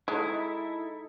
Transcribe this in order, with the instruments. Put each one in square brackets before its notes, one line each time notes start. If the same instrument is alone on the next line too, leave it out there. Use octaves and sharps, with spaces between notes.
[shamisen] G#3 [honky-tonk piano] D#4 A4 A#5 [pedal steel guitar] E4